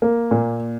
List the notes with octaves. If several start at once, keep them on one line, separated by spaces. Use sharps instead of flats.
A#3
A#2